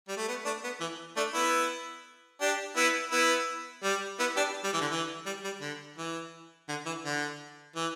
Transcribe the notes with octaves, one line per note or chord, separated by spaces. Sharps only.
G3
A3
B3
A3 D4
B3
E3
A3 D4
B3 E4
D4 G4
B3 E4
B3 E4
G3
B3 E4
D4 G4
G3
E3
D3
E3
G3
G3
D3
E3
D3
E3
D3
E3